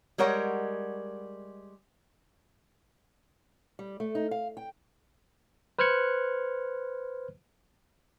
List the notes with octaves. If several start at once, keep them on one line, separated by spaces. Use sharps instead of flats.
G3 G#3 A#4 C#5 F#5
G3
A3
D#4
F5
G5
B4 C5 F6 F#6 G#6 C#7